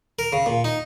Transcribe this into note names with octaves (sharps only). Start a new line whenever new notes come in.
A#4
C#3
A#2
D#4